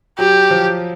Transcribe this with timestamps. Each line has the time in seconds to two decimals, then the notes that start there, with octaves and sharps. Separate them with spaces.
0.19 F#3 G4
0.51 F3